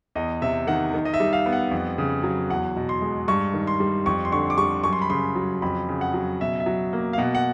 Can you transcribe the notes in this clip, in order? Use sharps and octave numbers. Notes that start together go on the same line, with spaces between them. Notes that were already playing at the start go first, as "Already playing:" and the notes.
E2 D#5
C3 E5
D#3 F#5
D#3
D#5
E5
G3
F5
B3
F#5
F2
C#3
F#3
E2 F#5
B2
C6
G#3
G2 C#6
D#3
C6
G3
F2 C#6
C6
D3 C#6
D6
G3 C#6
F#2 C#6
C6
B5
C#3 C6
F#3
F2 B5
C#3
F#5
F#3
B2 E5
E5
F#3
A#3
F5
B2 F#5
F#5